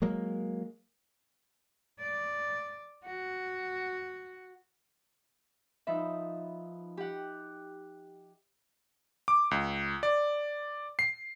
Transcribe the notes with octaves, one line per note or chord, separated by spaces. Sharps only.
F#3 G#3 A#3
D5
F#4
F3 D#4 B4 E5
G4 F#5
D6
C#2
D5
C7